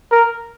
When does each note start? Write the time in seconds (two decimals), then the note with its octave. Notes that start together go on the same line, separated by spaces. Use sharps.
0.12 A#4